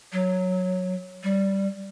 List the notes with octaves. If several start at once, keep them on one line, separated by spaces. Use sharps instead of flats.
F#3
G3